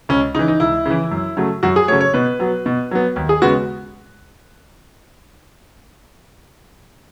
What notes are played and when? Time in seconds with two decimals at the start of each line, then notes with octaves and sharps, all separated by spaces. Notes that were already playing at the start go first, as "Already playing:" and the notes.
0.09 C#2 C#4
0.35 C#3 E3 D#4
0.48 D#4
0.60 C#2 E4
0.85 C#3 E3
1.11 F#2
1.37 C#3 F#3 A3
1.63 F#2 F#4
1.76 G#4
1.88 C#3 F#3 A3 C#5
2.01 C#5
2.14 B2 B4
2.39 F#3 B3
2.66 B2
2.91 F#3 B3
3.16 D#2
3.29 G#4
3.42 C#3 G#3 B3 F#4